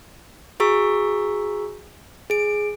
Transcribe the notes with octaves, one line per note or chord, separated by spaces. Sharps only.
F#4 G#4 A#5 C#6 E6 B6
G#4 D7